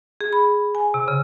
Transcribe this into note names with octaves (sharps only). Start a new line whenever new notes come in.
G#4
B5
G#5
C3
C#3